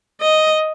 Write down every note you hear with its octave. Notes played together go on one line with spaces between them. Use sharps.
D#5